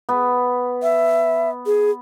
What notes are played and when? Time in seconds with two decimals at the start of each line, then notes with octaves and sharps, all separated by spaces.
0.09 B3
0.83 E5
1.66 G#4